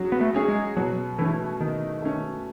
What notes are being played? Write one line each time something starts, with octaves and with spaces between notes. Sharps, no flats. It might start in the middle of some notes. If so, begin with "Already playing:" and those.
Already playing: F#3 C#4 G#4
B3
A3
C#4 G#4 C#5
G#3
B2 F#3
E3 A3 C#4
B2 D#3
A3 C#4